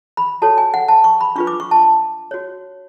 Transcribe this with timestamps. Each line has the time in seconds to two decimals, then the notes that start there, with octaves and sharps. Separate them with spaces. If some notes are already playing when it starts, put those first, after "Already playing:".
0.17 B5
0.42 F#4 A4 C#5 A5
0.58 G#5
0.74 F#5
0.88 A5
1.04 C#6
1.21 B5
1.36 D4 F4 B4 C#6
1.47 D6
1.60 C#6
1.71 A5
2.31 F#4 C#5